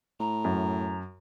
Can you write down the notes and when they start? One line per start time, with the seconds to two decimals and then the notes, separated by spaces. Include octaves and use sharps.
0.20 A2 A#5
0.45 F#2